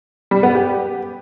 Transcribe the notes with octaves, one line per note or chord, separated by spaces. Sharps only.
G3
B3
G4